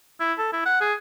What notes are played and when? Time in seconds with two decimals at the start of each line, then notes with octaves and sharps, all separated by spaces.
0.20 E4
0.38 A4
0.53 E4
0.66 F#5
0.81 G#4